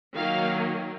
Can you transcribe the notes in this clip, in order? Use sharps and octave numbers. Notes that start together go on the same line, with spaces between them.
D#3 F#3 A#3 F5